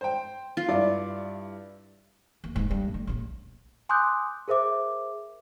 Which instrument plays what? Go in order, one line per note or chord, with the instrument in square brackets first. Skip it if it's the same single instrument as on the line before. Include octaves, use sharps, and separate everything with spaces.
[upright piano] C5 G5
[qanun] F4
[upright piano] G2 E4 D5
[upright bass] D#2
F1 G#2
G2
A3
A#1 C#3
[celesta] G#5 C6 D6 D#6 F#6 G6
G#4 A#4 C5 E5 D6